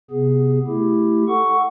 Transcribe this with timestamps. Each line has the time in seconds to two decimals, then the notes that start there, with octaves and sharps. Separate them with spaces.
0.11 C3 B3 G#4
0.67 A3 E4 G4
1.28 A4 F#5 C#6